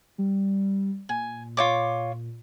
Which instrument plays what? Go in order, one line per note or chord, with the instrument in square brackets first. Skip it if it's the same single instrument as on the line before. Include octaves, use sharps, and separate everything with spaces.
[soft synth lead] G3
[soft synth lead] A#2 [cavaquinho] G#5
[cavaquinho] F4 C#5 D6